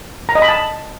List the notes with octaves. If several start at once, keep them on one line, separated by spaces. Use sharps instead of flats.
A#5
D#5
B5
A5